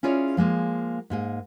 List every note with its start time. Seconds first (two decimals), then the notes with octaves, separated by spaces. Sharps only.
0.03 C#4 E4 F4 G#4 C#5 D5
0.37 F3 G#3 A#3 G#4
1.10 G#2 A#3 G#4